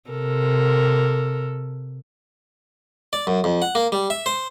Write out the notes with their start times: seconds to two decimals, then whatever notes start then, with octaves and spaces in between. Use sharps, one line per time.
0.10 C3 A4 A#4
3.13 D5
3.27 F#2
3.44 F2
3.62 F#5
3.75 A#3
3.92 G3
4.10 E5
4.26 C5